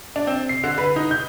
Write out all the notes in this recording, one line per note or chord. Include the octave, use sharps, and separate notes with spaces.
D4
C4
C7
D3
B4
D#4
G6